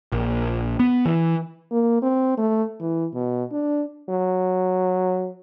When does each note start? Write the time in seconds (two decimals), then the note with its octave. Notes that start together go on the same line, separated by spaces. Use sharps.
0.12 A#1
0.79 B3
1.05 E3
1.71 A#3
2.02 C4
2.38 A3
2.80 E3
3.14 B2
3.52 D4
4.09 F#3